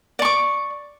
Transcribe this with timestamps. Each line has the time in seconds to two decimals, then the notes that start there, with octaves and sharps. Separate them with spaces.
0.19 D5
0.22 C#6
0.25 D6